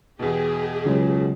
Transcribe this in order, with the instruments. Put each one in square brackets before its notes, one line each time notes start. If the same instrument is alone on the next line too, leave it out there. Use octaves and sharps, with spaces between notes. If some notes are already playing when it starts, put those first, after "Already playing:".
[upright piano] E2 B2 [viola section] G4 G#4
[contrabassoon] C#2 [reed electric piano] C#3 F#3 G#3